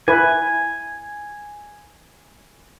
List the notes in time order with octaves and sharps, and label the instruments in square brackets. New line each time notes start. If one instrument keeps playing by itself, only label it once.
[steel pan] E4 B4 [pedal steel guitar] G#5